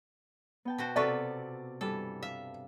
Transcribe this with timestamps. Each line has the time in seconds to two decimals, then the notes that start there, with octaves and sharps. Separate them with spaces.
0.65 B3 G5 A5
0.78 B2 F#4 C5
0.96 C3 F4 F#4 A4 B4 D5 C#6
1.81 G2 E3 G3 A4
2.23 E5 F5